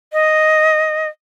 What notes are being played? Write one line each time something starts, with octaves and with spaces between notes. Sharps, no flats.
D#5